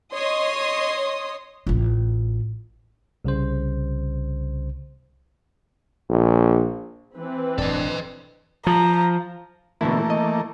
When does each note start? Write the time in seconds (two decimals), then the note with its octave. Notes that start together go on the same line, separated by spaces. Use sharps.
0.14 C#5 D#5 C6 D#6
1.67 A1 F4
3.25 C2 C#3 C5
6.10 A#1
7.16 E3 C4 B4
7.58 E1 A2 D4 A4 D#5
8.67 F3 A#5
9.81 B2 D3 E3 A3 A#3 E4
10.10 D#5